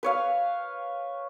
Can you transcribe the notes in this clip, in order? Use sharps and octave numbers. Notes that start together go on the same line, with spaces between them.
B4 C#5 F5